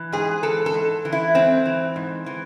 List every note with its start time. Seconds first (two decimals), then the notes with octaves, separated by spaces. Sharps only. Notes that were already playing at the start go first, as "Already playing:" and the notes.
Already playing: E3
0.12 G#2 G#4
0.43 E3 A4
0.66 A4
0.74 G#2
1.05 E3
1.13 E4
1.35 G#2 C4
1.66 E3
1.96 G#2
2.26 E3